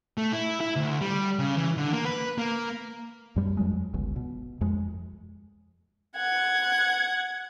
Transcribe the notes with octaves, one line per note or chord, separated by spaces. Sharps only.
A3
E4
E4
D2
G3
C#3
E3
D3
A#3
B4
A#3
F#2 G3
F2 F#3 G#3
G1 C#2
B2
F2 G#3
F#5 G#6